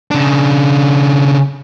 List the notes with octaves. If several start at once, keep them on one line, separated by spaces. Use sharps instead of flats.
C#3 D4